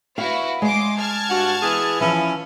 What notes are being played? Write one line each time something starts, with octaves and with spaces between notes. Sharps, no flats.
E4 F#4 B4 F5
G#3 D#5 C6 D6
A5 F6 G#6
G2 F#4 F#5
E3 B3 G#4
E3 F3 C#4 E4